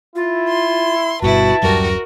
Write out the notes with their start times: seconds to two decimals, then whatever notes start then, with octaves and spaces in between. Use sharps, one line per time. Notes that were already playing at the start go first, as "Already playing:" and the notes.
0.16 E4 F4
0.48 C6
1.22 G1 G2 B2 E4 F#4 B4 A5
1.62 D1 F#2 G3 F#4 A#4